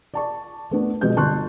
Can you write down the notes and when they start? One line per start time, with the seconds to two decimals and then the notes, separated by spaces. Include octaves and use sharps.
0.14 D5 A5 C#6
0.71 A3 B3 D4
1.01 B2 F3 G#3 D#5 G6
1.16 G1 D3 A5 C6 C#6 F#6